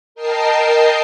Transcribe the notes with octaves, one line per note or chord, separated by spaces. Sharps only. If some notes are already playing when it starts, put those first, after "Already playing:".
A#4 D#5 G5 A5 C7